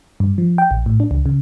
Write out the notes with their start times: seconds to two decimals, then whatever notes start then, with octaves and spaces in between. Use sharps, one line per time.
0.20 G2
0.38 F3
0.58 G5
0.71 A#1
0.86 A2
1.00 D4
1.11 C#2
1.26 C#3